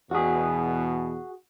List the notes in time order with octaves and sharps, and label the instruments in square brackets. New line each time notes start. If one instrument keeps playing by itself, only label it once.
[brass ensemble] E2 B2 [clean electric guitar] F#4 G#4